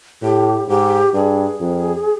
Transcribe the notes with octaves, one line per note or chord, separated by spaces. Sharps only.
A2 G4
G#2 G4
G2 G#4
F2